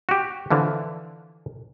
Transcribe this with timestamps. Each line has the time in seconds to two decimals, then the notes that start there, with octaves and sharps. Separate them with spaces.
0.09 F#4 G4
0.51 D3 E3 F3